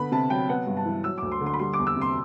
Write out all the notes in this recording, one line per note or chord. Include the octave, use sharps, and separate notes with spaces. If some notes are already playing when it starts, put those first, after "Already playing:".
Already playing: D3 B3 B5
C3 A5
F#3 G5
B3 F#5
G2
A5
E3
F#3 E6
D2 D6
C6
D3
C6
B5
G3 C6
D6
E2
E6
C3
C6